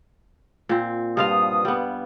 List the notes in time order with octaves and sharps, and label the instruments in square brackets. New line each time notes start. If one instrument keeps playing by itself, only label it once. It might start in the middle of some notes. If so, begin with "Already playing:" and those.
[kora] A#2 C4
[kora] G2 F4 F5 [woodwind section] B2 F3 D#6
[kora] G3 B3